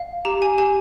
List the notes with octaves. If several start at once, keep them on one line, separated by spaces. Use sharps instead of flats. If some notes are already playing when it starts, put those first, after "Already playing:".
Already playing: F5
G4 A#5
G#5
G4 G#5